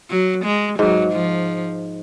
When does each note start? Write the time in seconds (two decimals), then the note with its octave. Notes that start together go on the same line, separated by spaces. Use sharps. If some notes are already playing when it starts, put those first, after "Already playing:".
0.10 F#3
0.45 G#3
0.79 G#2 F#3
1.13 F3